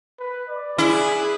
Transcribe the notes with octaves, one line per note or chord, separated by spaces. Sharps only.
B4
D5
E4 G#4 B4